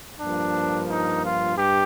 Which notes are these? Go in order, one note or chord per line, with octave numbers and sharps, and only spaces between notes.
G2 F3 A#3 D4
D#4
F4
G2 G4